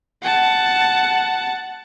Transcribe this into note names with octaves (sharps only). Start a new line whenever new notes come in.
F#5 A5